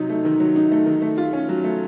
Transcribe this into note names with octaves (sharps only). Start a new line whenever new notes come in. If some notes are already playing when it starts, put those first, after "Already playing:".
Already playing: C3 F#3 D#4
A3
D#3
F#3
D#4
A3
D#3
A3
F4
C#4
F#3
A3